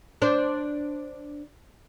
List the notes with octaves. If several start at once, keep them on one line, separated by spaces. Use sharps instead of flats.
D4 C5